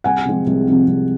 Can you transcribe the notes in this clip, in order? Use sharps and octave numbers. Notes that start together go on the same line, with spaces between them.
C2 F#5 G#5
C3 F3 G#3 C4
C2
C3 F3 G#3 C4
C2